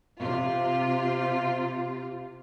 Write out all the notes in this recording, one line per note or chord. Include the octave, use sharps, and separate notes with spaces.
C3 F4